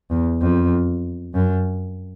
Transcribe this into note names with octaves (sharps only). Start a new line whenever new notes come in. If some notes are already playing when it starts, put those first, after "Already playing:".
E2
F2
F#2